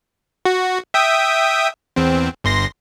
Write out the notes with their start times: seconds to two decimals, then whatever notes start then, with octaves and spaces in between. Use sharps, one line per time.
0.45 F#4
0.94 E5 G5 D#6
1.96 E2 C4
2.44 G1 C6 A#6